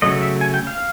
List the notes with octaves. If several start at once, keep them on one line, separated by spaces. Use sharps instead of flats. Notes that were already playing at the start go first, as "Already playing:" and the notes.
C#3 F#3 A3 D#5
E5
G#5
G5
F5